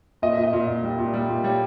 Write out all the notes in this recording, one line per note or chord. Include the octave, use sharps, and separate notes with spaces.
A#2 D#5
A#2 E5
D#5
A#2
A#2
G3
A#2
G3
A#2
G3 C#5